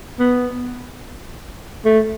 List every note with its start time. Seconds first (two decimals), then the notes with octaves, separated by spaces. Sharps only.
0.19 B3
1.85 A3